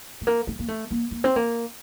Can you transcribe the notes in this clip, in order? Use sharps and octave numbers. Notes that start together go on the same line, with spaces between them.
A3
A#3
A3
A#3
A3
A#3
A#3
C4
A#3